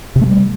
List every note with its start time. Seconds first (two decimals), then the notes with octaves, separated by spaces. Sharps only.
0.16 C3
0.21 A3
0.27 G3